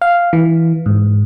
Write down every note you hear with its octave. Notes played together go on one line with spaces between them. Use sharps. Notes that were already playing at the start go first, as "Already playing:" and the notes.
F5
E3
G#2